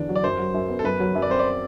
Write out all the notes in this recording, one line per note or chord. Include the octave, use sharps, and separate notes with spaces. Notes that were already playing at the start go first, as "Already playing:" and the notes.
Already playing: E2 D3 D4
F#3
D5
F#2 C5
F#3
F#2
B3
A4
F#2 B4
F#3
F#2
D5
C4 C5
D5